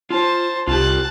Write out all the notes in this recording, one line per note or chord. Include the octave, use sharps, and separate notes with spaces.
F4 C5 A5
C2 F4 G4 A5 F#6